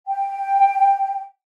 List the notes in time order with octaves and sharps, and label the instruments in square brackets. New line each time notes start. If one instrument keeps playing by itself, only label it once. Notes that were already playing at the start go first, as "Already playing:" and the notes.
[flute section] G5